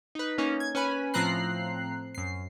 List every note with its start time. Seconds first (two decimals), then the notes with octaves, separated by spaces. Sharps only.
0.15 D#4 B4
0.38 A#3 C#4 D#4
0.60 G#6
0.75 C#4 B4 G#5 B5
1.14 A2 F3 C4 A#5 F#6 C7
2.15 F#2 C7